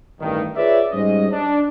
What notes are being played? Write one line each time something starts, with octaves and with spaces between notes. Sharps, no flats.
A1 G2 D#3
F4 G#4 B4 C#5 D5 E5
G#2 G3 C#4 C5 D#5
D4